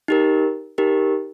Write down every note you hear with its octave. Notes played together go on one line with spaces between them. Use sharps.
D#4 G4 A#4
D#4 G4 A#4